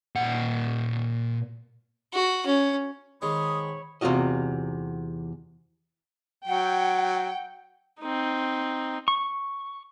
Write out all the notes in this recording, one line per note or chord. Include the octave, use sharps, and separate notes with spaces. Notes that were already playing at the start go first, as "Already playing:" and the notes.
A#2 F#5
F#4
C#4
G#2 D#3 G#3 C#5 B5 D#6
E2 C3 G#3 F4 F#4 D#5
F#3 F#5 G5
C4 D#4
C#6